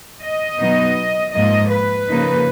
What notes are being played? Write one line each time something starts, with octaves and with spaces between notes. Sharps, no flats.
D#5
B2 F#3 B3 D#4
G#2 F3 A#3 D#5
B4
C#3 F3 A#3 D#4